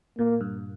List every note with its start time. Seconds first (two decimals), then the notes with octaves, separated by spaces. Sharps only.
0.18 A#2 A#3
0.41 G2